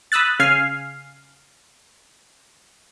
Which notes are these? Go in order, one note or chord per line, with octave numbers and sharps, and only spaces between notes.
B5 D#6 E6 F#6 A6
C#3 F5 G#5 F6 C7